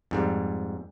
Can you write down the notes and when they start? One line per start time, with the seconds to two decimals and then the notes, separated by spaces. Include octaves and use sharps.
0.11 F2 G#2 G3